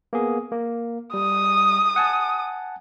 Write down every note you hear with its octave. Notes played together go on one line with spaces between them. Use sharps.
A#3 B3 G#4
A#3
G3 D#6
F#5 G#5 A5